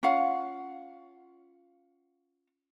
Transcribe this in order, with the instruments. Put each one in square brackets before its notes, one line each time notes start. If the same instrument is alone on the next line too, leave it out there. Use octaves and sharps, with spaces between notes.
[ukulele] C#4 F4 F5 F#5